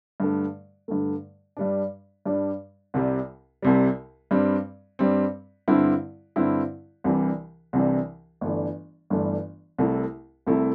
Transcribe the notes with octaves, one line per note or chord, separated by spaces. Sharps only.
G2 D3 A3
G2 D3 A3
G2 G3 D4
G2 G3 D4
C2 C3 G3
C2 C3 G3
G2 G3 C4
G2 G3 C4
G2 D3 C4 E4
G2 D3 C4 E4
C2 C3 E3 G3 D4
C2 C3 E3 G3 D4
G1 G2 E3 A3 D4
G1 G2 E3 A3 D4
C2 C3 A3 E4
C2 C3 A3 E4